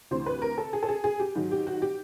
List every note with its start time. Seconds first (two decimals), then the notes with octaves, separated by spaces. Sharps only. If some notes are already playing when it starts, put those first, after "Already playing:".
0.11 D2 C3 E3 C5
0.26 B4
0.42 A#4
0.58 A4
0.73 G#4
0.83 A4
0.89 G#4
1.04 G#4
1.20 G4
1.35 G#2 D#3 F#3
1.52 G4
1.67 F#4
1.82 G4